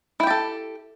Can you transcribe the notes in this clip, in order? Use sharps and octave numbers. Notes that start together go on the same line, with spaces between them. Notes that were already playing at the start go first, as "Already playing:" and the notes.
E4 G4 A4 G5